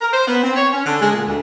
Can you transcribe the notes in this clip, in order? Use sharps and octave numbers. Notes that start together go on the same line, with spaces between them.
A#4
C5
B3
C4
C#5
C#4
D3
G#3
A#2
D2